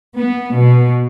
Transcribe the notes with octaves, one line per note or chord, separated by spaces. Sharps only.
B3
B2